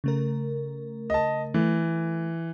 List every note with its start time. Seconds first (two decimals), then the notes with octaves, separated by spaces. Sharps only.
0.04 C#3 A3 A#4
1.10 D#5 A5
1.54 E3 A3